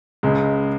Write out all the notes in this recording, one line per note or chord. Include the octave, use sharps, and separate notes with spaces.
C#2 C#3 G#3